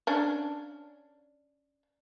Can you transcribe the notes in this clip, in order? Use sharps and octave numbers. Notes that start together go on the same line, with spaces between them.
C#4 D4